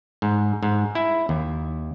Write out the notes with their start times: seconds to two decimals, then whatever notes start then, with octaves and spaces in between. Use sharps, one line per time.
0.22 G#2
0.63 G#2
0.95 E4
1.29 D#2